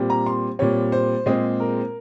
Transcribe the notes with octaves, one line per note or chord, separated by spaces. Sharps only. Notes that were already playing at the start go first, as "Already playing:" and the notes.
Already playing: A#2 G3 C4
A#5
C6
A#2 G3 C4 C#5
C5
A#2 G#3 C4 G#4
A#4